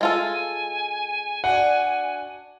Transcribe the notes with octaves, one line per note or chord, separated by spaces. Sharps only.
G#3 F4 A4 G#5
D4 F#4 F#5